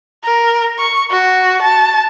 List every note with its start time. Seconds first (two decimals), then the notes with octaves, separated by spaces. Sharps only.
0.24 A#4
0.79 C#6
1.11 F#4
1.62 A5